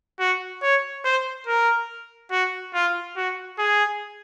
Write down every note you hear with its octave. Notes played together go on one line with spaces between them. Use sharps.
F#4
C#5
C5
A#4
F#4
F4
F#4
G#4